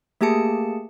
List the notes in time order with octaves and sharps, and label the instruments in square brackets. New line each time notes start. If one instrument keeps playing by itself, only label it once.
[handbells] A3 A#3 G4 G#4 A5 C#7